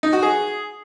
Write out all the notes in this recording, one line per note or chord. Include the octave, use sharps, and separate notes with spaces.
D#4
F#4
G#4